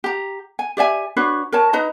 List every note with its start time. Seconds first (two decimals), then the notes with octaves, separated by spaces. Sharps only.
0.04 G4 A#5
0.59 G#5
0.77 G4 D5 E5 G#5
1.17 D4 F#4 B4 C#5
1.52 A#4 C#5 A5
1.73 D#4 B4 D#5 A#5